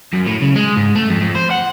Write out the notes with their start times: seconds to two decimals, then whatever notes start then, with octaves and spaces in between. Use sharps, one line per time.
0.13 F#2
0.26 A2
0.42 C#3
0.56 G#3
0.77 G#2
0.95 A3
1.10 F2
1.21 F2
1.35 C5
1.51 F#5